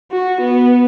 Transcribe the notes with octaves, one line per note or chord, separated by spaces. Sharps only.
F#4
B3